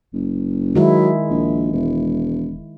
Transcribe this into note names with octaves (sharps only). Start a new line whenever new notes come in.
F#1
D#3 F#3 G#3 E4
A#1
E1